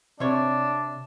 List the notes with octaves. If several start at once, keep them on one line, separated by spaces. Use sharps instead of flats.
C3 D4 C#5